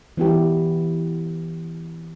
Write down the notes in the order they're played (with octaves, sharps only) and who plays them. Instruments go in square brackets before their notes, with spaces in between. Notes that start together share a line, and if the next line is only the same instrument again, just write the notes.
[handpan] E3 B3 E4 G4